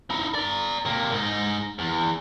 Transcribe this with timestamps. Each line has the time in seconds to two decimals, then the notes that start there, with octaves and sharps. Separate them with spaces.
0.10 D#4 E4
0.35 D5 A#5
0.85 C3 A#3
1.12 G#2 D#4
1.79 E2